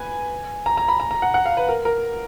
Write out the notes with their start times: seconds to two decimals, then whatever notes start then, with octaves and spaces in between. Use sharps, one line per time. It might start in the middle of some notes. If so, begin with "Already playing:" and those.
Already playing: B4 G#5
0.66 A#5
0.77 A#5
0.88 B5
1.00 A#5
1.11 A#5
1.22 F#5
1.34 F#5
1.46 F5
1.57 B4
1.69 A#4
1.85 A#4